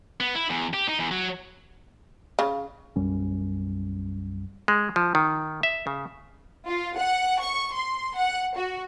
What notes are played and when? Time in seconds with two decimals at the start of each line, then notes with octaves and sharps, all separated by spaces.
0.20 B3
0.35 E4
0.50 E2
0.73 G4
0.88 D#4
0.99 E2
1.11 F#3
2.39 C#3
2.96 B1 F#2 G3 C#4
4.68 G#3
4.96 F3
5.15 D#3
5.63 E5
5.87 C#3
6.66 F4
6.97 F#5
7.40 C#6
7.75 C6
8.16 F#5
8.56 F#4